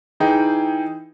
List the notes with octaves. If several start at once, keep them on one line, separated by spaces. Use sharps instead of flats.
E3 D#4 G#4 G5